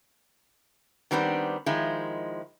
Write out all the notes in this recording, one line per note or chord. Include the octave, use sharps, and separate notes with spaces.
D#3 G3 B3 C4 D4
D#3 F3 G#3 E4